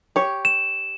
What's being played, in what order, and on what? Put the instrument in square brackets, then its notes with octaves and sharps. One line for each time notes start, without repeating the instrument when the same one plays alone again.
[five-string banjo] G4 C#5
[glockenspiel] E7